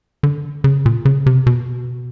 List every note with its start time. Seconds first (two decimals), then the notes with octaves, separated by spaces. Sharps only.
0.23 D3
0.64 C#3
0.86 A#2
1.05 C#3
1.26 C3
1.47 B2